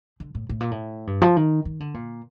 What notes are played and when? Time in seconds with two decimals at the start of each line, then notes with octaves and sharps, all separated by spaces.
0.20 D3
0.35 A2
0.49 A2
0.60 A#2
0.71 A2
1.07 G2
1.22 F3
1.36 D#3
1.65 D#3
1.80 D3
1.94 A#2